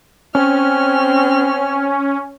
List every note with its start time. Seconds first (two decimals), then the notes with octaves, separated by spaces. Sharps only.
0.35 C4 C#4 F6